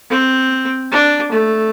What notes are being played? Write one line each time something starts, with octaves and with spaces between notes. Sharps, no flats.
C4
D4
A3